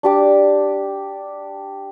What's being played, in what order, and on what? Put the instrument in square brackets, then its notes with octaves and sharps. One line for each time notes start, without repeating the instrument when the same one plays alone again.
[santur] D4 G4 D6